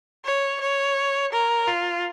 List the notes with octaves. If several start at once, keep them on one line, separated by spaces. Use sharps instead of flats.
C#5
C#5
A#4
F4